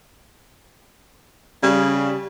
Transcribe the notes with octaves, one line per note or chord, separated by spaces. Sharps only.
C#3 G3